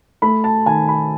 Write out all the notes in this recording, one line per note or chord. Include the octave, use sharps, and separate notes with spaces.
A3 B5
A5
D#3 G#5
B5